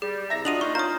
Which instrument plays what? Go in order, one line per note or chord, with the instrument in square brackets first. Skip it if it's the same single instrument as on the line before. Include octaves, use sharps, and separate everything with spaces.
[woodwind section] G3 [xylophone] G#4
[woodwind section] C2 A#5 [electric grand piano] E5 A#6
[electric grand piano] D4 F4 [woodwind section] F#4 D#5 [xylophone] D#7 F7 F#7
[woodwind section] A#3 F4 [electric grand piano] D#4 [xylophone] C#6
[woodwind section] C#4 F4 F5 [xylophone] A#5 D#6 [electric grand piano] G6